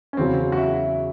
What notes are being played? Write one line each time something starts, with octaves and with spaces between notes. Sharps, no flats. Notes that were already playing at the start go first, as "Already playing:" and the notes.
C#4
E2 C#3 F#3 C4
F#4
E4